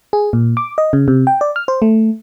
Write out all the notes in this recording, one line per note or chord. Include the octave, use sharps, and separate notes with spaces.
G#4
A#2
D6
D#5
C#3
C3
G5
D5
F6
C5
A3